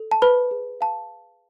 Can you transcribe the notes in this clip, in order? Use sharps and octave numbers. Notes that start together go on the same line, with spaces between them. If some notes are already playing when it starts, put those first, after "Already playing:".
Already playing: A4
A5
B4 C5 B5
G#4
F5 A5